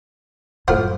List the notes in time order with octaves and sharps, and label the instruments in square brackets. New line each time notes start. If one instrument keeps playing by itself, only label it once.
[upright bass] F#2 G3 [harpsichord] A2 F4 C5 [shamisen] F#5